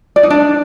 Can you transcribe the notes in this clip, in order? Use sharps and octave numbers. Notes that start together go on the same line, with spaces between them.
D5
D#4
D4